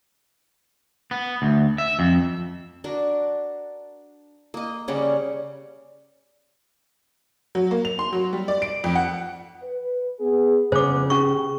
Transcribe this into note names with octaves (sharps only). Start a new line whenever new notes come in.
B3
D2
E5
F2
D4 F#4 A#4
A#3 D#5
C#3 G3 C#4 F#5
F#3
A#3
F7
C6
F#3
G3
D5
D7
F2
F#5
B4
B3 G#4
F2 C#3 B3 C5 D6
C#4 G4 G#4 C#6